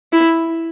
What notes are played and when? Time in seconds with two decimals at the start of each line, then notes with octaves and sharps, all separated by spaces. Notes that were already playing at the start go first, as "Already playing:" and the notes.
0.13 E4